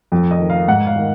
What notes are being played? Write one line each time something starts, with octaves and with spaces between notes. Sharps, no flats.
F2
D#5
D#3
F5
G#2 F#5
F5
D#3